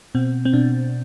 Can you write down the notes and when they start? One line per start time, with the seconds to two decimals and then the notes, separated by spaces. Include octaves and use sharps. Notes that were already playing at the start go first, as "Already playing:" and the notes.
0.15 B2 C4
0.45 C4
0.53 B2 D4